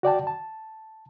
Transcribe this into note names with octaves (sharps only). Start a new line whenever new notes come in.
F#4 D5 G5 A5
A5